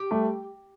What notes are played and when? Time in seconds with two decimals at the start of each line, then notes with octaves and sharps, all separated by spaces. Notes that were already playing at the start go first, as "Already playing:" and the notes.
Already playing: G4
0.11 G3 A3